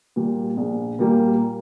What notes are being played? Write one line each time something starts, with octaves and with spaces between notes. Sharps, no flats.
A#2 G3 A#3
A#1
A#2 G3 A#3